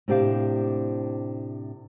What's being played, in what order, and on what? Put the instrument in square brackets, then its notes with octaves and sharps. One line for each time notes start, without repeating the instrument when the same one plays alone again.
[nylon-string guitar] A2 C3 D4 G4 C5 F5